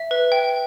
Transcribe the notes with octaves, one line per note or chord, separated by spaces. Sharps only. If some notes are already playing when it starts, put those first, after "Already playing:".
Already playing: E5
B4
G5